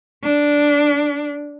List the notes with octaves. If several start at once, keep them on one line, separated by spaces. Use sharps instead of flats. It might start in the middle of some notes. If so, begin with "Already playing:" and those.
D4